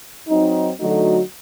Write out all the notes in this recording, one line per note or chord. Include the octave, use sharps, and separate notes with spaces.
F#3 C4 D#4
D3 F#3 A3 D#4 F#4